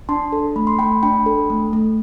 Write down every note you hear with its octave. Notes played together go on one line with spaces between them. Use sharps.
D4 A5 C6
A4
A3 B5
C6
A3 G5 B5
D4 G5 B5
A4
A3
A3